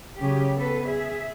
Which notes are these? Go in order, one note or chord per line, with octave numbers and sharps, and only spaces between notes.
C#3 F#3 C#4 G4
B3 A4 B4
G#4 E5